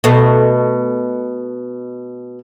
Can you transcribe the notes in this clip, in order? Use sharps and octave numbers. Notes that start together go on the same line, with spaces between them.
B2 A3